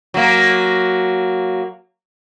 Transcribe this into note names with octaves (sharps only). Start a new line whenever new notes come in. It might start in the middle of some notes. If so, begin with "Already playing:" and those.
F#3 A#3